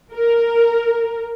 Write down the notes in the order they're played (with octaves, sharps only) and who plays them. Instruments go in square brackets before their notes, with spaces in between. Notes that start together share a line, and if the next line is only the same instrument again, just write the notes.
[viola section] A#4